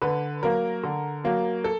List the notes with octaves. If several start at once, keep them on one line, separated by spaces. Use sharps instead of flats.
D3 B4
F#3 A#3 A#4
D3
F#3 A#3
A4